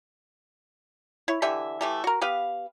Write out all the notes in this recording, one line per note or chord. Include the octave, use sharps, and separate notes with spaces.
E4 C#5
D3 E3 G4 E5
E3 A3 G4
F#4 A#4
B3 G4 B4 F5